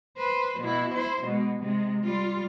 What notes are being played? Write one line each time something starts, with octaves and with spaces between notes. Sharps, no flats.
B4 C5
B2 E4
E4 C5
B2 G#3
C3 G#3
G3 F4